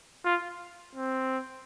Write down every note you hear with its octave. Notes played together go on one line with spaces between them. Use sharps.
F4
C4